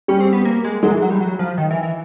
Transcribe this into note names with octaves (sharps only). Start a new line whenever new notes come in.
G3 C#4
C4
B3
A#3
G#3
F#3 G#3
E3
F#3
G3
F#3
F3
D#3
E3
E3